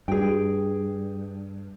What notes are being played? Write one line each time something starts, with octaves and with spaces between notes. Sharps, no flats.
G2 G#4 G5